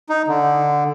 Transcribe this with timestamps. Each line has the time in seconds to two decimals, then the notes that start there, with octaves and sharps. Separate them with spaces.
0.09 D#4
0.28 D3